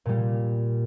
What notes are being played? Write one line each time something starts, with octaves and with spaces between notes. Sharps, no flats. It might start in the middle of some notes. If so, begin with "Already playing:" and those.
A#2 G3